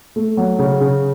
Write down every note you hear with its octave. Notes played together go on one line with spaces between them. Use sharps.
A3
F#3
C#3
C#3